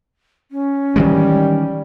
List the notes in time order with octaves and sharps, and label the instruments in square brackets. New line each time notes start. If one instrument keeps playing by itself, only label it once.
[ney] C#4
[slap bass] D#3 E3 G#3 [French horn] G3